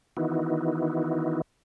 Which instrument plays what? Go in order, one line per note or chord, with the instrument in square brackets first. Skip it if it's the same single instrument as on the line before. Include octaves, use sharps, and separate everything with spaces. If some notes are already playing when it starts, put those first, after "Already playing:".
[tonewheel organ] D#3 E3 B3 D#4 E4 F#4